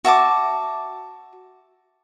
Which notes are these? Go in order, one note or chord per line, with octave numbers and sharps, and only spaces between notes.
F#4 E5 A5 D6